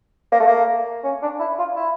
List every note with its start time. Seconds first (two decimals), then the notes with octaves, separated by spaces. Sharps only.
0.32 A#3
0.40 A3
0.47 A#3
1.04 C#4
1.22 D4
1.39 E4
1.58 F4
1.76 E4